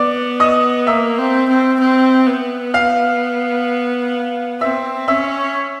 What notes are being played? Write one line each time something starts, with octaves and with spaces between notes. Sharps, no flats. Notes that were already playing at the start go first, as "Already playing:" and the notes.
Already playing: B3 D5 D6
D#5 D#6
A#3 E5 E6
C4
C4
C4
B3
F5 F6
C4 E5 E6
C#4 E5 E6